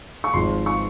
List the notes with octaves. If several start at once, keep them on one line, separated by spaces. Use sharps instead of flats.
C#6
G#1 G#2 F3 G#3 C6
C#6